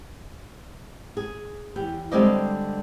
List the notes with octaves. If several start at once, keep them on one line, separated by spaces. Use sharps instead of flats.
G#4
E2 G4
D3 G3 G#3 C4 D5 D#5